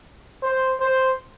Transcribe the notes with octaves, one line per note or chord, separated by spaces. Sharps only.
C5
C5